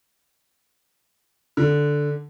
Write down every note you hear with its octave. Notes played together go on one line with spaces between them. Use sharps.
D3